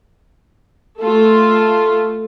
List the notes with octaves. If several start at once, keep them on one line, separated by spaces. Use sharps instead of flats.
A3 F4 A4